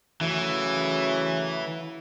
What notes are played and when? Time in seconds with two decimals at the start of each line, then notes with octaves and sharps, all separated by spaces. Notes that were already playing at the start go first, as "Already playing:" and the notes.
0.21 C#3 E3 F#3 A3